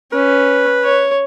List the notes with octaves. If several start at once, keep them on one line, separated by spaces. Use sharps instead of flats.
C#4 B4
C#5